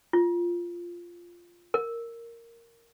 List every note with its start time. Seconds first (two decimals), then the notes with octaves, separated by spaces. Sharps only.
0.13 F4
1.74 A#4